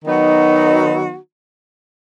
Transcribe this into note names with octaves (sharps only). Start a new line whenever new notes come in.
D#3 F#3 B3 D#4 F#4